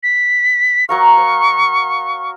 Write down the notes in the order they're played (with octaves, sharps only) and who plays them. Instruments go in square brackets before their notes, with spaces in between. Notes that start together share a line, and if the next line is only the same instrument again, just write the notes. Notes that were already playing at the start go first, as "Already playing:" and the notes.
[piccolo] B6
[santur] F#3 A#4 F5 [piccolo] C#6
[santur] C#5